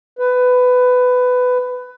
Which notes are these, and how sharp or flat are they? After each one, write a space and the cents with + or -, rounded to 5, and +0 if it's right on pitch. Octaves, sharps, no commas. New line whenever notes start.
B4 +15